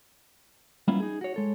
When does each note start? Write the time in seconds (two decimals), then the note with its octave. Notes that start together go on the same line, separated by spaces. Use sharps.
0.88 G3 A#3 B3 C#4 E4 F4
1.00 D#4 G#4
1.21 F#4 C#5
1.34 G#3 A4 C#5